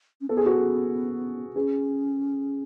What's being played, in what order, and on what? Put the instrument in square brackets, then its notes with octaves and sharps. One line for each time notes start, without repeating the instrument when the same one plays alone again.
[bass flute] C#4
[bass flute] B3 [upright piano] A4
[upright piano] G#4
F#4
G#4
[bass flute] C#4 [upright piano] G#4